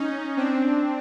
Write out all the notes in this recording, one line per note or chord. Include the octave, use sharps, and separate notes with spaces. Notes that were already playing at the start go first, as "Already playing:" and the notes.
Already playing: C#4 D#4
C4 D4